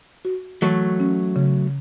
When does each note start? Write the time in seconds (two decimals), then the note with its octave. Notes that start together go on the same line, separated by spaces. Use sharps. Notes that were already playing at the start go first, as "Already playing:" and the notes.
0.25 F#4
0.62 E3 F#3 A3
1.00 C#4
1.36 C#3